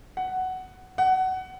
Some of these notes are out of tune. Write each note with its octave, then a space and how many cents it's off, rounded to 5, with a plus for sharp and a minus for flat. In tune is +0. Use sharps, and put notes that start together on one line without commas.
F#5 +10
F#5 +20